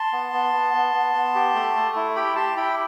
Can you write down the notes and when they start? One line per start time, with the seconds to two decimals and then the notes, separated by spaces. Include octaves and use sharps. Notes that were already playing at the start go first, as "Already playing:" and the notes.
Already playing: A5 C6
0.13 B3
0.33 B3
0.53 B3
0.74 B3
0.94 B3
1.14 B3
1.35 G4
1.55 A3
1.75 A3
1.96 E4
2.15 G4 G5 B5
2.36 G4 A5 C6
2.56 E4 G5 B5